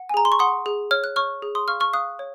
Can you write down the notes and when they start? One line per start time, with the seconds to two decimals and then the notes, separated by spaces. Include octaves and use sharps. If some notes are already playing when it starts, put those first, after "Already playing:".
Already playing: F#5
0.09 G#5
0.14 G#4 A#5
0.25 C6
0.32 C#6
0.39 F#5 C6 D#6
0.66 G#4
0.91 C#5 F6
1.04 F#6
1.16 C#5 C#6 F6
1.42 G#4
1.55 C6 D#6
1.68 F5 C#6 F6
1.80 C#6 F6
1.93 F5 D#6 F#6
2.19 C#5